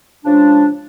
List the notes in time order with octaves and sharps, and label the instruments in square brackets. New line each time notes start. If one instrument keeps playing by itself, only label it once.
[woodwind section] C#3 F3 G#3 D4